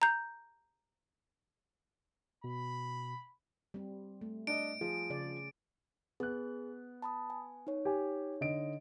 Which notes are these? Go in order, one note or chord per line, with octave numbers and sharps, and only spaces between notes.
A#5 G6
B2 B5
G3 C4
A3
D4 D#5 D7
F3 G#4
C#3 D5
B3 G#4 F#6
A5 B5 D#6
G#5
D#4 C#5
G4 G#5
D3 D#5 D7